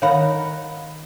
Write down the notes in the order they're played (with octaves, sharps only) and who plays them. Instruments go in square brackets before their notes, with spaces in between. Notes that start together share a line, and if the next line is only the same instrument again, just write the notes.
[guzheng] D#3 F#5 A#5 [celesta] C#5 F5 B5